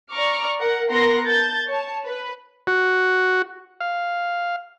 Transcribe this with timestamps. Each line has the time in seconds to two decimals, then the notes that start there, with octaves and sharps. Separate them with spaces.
0.11 D5 A#5 C#6 D6 F6
0.59 A#4 F#5
0.90 B3 A#4 F#5 A#5 C6 A#6
1.26 A5 G6 A6
1.67 C#5 A5
2.05 B4
2.67 F#4
3.81 F5